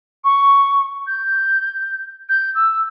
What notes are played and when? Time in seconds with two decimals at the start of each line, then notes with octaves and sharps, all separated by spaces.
0.24 C#6
1.07 G6
2.29 G6
2.55 E6